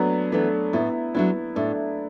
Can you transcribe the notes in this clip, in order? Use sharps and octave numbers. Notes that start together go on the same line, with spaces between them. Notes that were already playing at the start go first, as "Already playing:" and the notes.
Already playing: F#3 A3 B3 D4
E3 A3 B3 D4
A2 B3 E4
F#3 A3 B3 D4 E4
A2 A3 D4